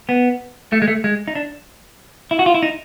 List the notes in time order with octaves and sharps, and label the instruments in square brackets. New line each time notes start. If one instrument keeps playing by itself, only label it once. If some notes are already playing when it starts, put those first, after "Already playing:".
[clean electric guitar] B3
A3
G#3
A3
G#3
D#4
D4
E4
F#4
F4
E4
D#4